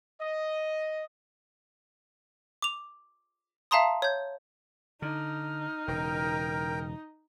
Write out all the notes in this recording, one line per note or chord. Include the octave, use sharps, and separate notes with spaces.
D#5
D6 F7
E5 F5 A5 A#5 C6 D#6
C#5 G6
D3 D#4 F6
E1 C#3 A#4 G5